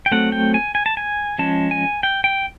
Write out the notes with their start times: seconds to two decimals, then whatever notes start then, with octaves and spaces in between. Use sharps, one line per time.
0.06 G5
0.12 F#3 A3 C4 F#5
0.32 G5
0.54 G#5
0.75 G#5
0.86 A5
0.97 G#5
1.38 F3 G#3 C#4 A5
1.71 G#5
2.03 G5
2.24 G5